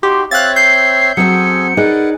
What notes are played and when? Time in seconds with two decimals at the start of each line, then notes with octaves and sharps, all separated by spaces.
0.03 D#4 F#4 G4 C6
0.31 C4 C#5 E5 F5 F#6 A6
0.56 G6 C7
1.17 F#3 C4 F#4 G#4 A4 G#5 C#7
1.77 D#4 G#4 A#4 B4 D5 F#5